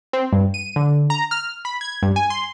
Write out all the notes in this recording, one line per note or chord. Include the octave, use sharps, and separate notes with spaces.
C4
G2
D#7
D3
A#5
F6
B5
G#6
G2
G#5
C6